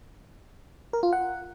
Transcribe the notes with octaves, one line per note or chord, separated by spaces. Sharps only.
A#4
F4
F#5